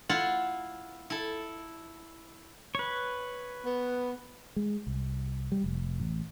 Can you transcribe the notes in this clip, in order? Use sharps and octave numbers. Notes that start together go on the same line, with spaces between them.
E4 F4 F#5 A5
E4 A4
B4 C#5
B3
G#3
C2
G3
F1
A1